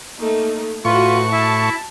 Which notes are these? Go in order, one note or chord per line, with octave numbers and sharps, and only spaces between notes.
A3 A#3 D#4
A2 F4 F#4 B4 C#6
E4 E5 A5